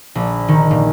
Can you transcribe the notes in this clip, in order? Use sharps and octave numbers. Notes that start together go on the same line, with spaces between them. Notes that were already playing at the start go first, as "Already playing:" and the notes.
A#1
D#3
A#2